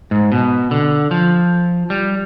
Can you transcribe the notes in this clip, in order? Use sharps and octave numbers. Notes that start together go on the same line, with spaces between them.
G#2
B2
D3
F3
G3